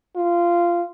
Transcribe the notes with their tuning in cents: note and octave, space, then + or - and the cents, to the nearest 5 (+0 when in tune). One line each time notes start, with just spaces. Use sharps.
F4 -15